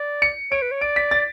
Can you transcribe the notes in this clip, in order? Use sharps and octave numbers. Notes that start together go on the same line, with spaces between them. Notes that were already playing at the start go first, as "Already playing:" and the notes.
Already playing: D5
C#7
C#5 D7
B4
C#5
D5 D7
B6
A6